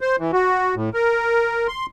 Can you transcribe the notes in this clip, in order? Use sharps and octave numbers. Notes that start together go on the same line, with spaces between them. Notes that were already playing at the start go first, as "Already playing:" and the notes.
C5
E3
F#4
A2
A#4
C6